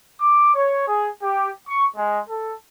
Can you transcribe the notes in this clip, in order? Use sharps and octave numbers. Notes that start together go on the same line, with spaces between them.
D6
C#5
G#4
G4
C#6
G#3
A4